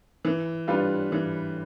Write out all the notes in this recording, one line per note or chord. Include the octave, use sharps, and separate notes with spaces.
E3
G3 D4 F4 B4
E3